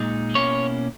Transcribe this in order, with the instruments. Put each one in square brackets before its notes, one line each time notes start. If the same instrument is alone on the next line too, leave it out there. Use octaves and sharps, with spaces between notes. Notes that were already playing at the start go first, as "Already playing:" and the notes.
Already playing: [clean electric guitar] A#2 G#3 D#4
B2 A#3 C#4 E4 C#5